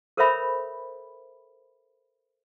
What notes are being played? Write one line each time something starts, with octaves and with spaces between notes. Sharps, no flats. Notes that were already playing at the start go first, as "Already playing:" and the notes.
A4 A#4 C5 C#5 E5 B5